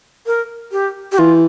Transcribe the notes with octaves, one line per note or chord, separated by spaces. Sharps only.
A#4
G4
G4
E3 F4